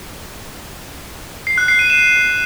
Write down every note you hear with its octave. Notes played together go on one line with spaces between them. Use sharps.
C7
F#6
C7
D#7
E7